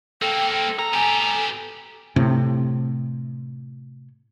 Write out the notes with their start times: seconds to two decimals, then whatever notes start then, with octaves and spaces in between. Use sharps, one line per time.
0.22 A#3 C4 A4 G5
0.79 G#2 A4 A#5
0.94 B3 G4 G#5
2.16 A2 C3